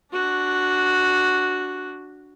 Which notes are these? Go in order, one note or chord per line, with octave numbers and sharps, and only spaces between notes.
D4 F#4